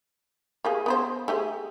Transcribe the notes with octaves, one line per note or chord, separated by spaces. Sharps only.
A#3 G4 G#4
B3 B4 C5
A3 G4 G#4